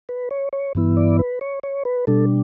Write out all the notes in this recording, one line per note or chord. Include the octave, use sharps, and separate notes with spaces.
B4
C#5
C#5
G2 E3 B3 E4
D5
B4
C#5
C#5
B4
B2 G3 D4 A4